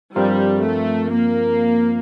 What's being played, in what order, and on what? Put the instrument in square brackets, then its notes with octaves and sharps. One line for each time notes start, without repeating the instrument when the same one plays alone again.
[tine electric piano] G2 F3 C4 F4 A#4 [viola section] G3
[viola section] A3
A#3